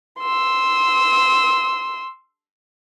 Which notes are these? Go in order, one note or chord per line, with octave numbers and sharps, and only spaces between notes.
C6 E6